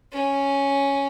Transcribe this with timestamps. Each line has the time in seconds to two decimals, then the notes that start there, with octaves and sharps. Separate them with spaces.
0.12 C#4